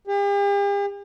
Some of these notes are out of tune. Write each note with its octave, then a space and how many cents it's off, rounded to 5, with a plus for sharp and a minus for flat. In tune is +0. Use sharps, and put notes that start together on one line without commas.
G4 +45